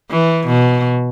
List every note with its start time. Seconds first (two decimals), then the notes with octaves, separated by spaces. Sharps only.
0.11 E3
0.47 B2